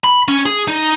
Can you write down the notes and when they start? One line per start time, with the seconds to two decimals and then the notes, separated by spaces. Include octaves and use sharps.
0.04 B5
0.28 C#4
0.46 G#4
0.68 D#4